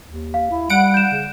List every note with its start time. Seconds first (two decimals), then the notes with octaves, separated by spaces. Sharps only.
0.05 D#2
0.34 F5
0.51 E4
0.70 G3 F#5 D7
0.94 G6 E7
1.12 C#3